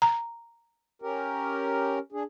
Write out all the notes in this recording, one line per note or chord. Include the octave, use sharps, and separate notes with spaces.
A#5
C#4 G4 A#4
D4 G#4